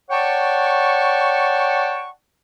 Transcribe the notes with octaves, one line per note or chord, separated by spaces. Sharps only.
C#5 D5 F#5 G5 A5 C#6